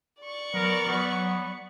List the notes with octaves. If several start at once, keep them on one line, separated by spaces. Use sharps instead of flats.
D5 C#6
F#3 B3 A#4
F#3 B3